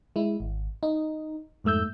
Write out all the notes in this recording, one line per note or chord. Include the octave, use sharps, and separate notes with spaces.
G#3 E4
G#1
D#4
F2 G#2 A3 E6 G6